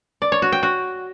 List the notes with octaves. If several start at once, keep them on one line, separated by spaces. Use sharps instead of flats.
D5
C#5
F#4
G5
F#4